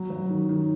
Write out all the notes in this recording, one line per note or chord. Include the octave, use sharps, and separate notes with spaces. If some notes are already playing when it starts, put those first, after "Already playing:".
Already playing: F#3
F#3
D#3
D#3